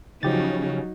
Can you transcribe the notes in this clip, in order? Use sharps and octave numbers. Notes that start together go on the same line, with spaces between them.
C#3 F3 F#3 D#4 G4 A6